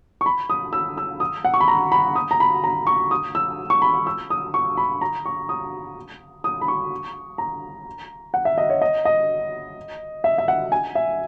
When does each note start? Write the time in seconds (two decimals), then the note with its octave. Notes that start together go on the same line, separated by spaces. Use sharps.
0.21 C#6
0.26 B5
0.50 D#6
0.73 E6
0.98 E6
1.20 D#6
1.45 F#5
1.54 C#6
1.61 B5
1.68 A#5
1.92 B5
2.16 D#6
2.31 A#5
2.40 B5
2.64 A#5
2.87 C#6
3.11 D#6
3.35 E6
3.70 C#6
3.82 B5
4.07 E6
4.30 D#6
4.54 C#6
4.77 B5
5.01 A#5
5.26 C#6
5.49 D#6
6.44 D#6
6.61 B5
6.68 C#6
7.38 A#5
8.34 F#5
8.45 E5
8.58 D#5
8.70 C#5
8.81 D#5
9.05 D#5
10.24 E5
10.38 E5
10.48 F#5
10.72 G#5
10.95 E5